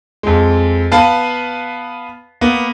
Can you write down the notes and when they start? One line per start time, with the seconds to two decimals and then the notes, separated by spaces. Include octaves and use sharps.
0.23 F2 G#3
0.92 B3 B4 F5 A5
2.41 A#3 B3